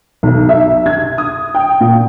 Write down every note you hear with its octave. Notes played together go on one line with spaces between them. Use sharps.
B1
E5
G#6
D#6
G5
A#2